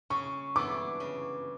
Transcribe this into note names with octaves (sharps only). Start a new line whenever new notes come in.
C#3 C#6
E3 B3 D4 A4 D6
C#3